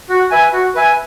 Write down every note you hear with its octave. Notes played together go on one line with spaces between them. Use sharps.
F#4
B4 E5 G#5
F#4
B4 E5 G#5